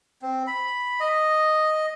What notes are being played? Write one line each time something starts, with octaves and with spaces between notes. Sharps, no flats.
C4
B5
D#5